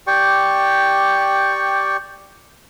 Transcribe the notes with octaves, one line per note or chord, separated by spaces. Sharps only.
G4 D5 G5 C#6